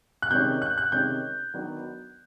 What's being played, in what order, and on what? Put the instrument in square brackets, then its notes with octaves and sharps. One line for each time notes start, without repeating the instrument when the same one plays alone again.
[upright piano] F#6
C3 D#3 G#3 C#4 G6
F#6
F#6
C3 D#3 G#3 C#4 G6
D#3 F#3 B3 D4